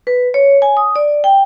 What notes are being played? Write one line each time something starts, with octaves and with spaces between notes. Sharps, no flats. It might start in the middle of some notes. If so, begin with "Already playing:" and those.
B4
C#5
G#5
D#6
D5
G5